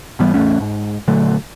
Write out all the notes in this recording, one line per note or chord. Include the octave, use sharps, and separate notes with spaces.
G#2 E3 G3 B3
A1 E2 A3 C#4
G#2
A#2 D3 F#3 A3